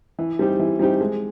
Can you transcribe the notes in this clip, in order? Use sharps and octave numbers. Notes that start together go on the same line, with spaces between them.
E3
G3 C4 D#4 G4
E3
G3 C4 D#4 G4
G#3